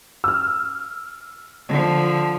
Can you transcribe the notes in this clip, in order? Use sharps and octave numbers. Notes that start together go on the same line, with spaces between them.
E6 F6
D3 F3